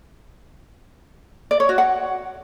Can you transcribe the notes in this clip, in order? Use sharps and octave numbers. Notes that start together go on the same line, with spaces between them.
D5
C#5
F#4
F#5